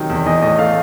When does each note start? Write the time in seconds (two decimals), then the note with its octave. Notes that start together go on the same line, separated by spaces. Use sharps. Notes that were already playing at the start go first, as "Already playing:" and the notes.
Already playing: C3 D#3 F#3
0.10 E2
0.26 E3 D#5
0.42 A2 D#5
0.58 A3 F5